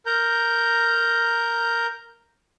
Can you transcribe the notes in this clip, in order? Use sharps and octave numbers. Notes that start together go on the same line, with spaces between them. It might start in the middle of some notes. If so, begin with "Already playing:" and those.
A#4 A#5 G6